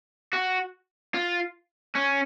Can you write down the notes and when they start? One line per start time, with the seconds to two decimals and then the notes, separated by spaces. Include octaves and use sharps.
0.33 F#4
1.14 F4
1.95 C#4